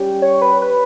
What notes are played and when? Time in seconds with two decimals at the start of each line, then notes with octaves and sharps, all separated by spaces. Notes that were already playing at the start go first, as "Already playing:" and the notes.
Already playing: G3 C#4 G4
0.22 C#5
0.42 B4
0.62 B4